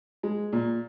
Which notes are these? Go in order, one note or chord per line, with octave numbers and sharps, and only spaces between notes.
G#3
A#2